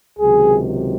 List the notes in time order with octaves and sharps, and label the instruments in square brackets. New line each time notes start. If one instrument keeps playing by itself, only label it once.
[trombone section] C#2 C3 D#3 F#3 G#4